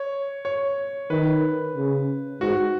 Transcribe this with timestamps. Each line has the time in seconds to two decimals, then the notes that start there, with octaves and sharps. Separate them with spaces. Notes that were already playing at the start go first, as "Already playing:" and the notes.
Already playing: C#5
0.45 C#5
1.10 D#3 B4
1.75 C#3
2.41 G#2 F#4